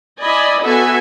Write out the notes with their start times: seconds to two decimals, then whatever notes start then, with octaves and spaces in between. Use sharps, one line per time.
0.22 E4 D5 D#5 G#5 B5
0.62 B3 F#4 A4 E5 G#5